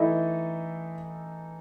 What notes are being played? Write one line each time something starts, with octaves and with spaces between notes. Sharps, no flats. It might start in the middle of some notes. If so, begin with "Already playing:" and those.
Already playing: E3 A3 D#4 E4 A4 D#5